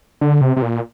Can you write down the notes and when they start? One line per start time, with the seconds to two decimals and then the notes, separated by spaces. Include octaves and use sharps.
0.21 D3
0.41 C3
0.57 C3
0.62 A#2